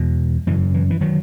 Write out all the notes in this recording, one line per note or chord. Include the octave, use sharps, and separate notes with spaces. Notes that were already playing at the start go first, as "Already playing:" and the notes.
Already playing: E2 B2
F#2 C#3 E3
E3
E3
D#3 F#3